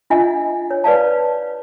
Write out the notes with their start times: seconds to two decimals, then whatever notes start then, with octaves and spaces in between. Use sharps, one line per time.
0.10 D4 F4 D#5 E5 F#5 G#5
0.71 C#5
0.84 B4 D5 F5 A5